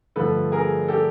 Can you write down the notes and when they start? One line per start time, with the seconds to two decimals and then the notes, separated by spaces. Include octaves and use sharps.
0.16 G2 D3 F3 A3 A4 B4
0.52 G#4 A#4
0.88 G4 A4